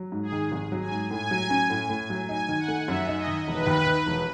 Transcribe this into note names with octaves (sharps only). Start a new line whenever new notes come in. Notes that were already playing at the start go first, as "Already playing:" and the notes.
Already playing: F#3
G#2
G#4
D#3
G#1
F#3
G#5
G#2
A2 G#5
F#3
C#4
A2
A2
F#3
D#4 G#5
D#3
F#5
A3
F#2 E5
D#4
D#5
D#3
E1 B4
D#2
D#3
E1